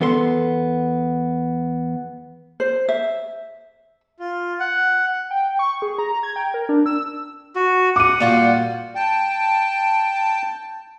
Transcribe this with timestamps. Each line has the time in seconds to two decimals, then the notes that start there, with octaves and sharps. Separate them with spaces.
0.01 E2 B3 A4 C6
2.60 C5
2.89 E5
4.19 F4
4.60 F#5
5.31 G5
5.59 C#6
5.82 G#4
5.98 A#5
6.23 G#6
6.36 G5
6.54 A#4
6.69 D4
6.86 E6
7.55 F#4
7.96 F#5 D6 D#7
8.20 A#2 G3 F4 F#4
8.95 G5 A5